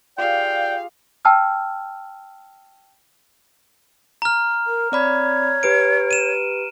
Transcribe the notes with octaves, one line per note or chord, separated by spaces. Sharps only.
F4 G4 G#4 D5 F5 G5
G5 A5 E6 F6
A#5 F6
A#4
C4 C#5 D5 B5
G4 B4 C#7 D7
D#7 E7